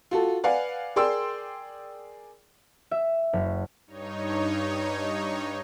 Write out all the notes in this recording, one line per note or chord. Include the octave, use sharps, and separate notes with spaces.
F4 F#4 A4
B4 D5 F5 F#5 G#5
G#4 A#4 D5 G5 C6 E6
E5
F#1
G2 D#4 C#5